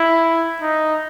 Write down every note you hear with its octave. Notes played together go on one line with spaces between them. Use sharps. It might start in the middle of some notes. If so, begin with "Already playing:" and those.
Already playing: E4
D#4